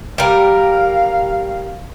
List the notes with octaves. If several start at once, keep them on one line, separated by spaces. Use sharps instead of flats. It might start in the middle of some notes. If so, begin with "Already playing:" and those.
G3 A#4 F5